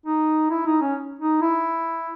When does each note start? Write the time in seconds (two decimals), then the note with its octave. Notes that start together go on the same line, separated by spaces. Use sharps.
0.06 D#4
0.50 E4
0.66 D#4
0.81 C#4
1.19 D#4
1.42 E4